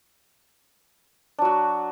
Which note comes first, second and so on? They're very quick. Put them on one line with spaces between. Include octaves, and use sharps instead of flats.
D4 F#3 F#4